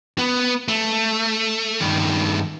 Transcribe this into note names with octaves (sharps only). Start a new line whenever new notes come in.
B3
A3
G2 D#3